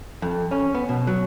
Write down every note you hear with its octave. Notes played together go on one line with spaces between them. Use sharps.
F2
C#4
B3
B2
F#3